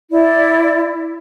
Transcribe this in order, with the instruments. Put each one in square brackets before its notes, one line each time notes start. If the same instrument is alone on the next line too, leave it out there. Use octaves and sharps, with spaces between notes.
[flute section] E4 D5